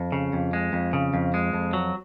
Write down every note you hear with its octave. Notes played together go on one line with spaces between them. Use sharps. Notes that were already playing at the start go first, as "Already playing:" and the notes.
Already playing: F2
C#3
F2
G#3
F2
C#3
F2
G#3
F2
F#3